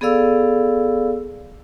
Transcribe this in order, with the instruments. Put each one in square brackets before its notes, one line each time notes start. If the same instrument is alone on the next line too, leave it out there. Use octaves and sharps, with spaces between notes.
[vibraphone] B3 G#4 A4 D5 F5 E6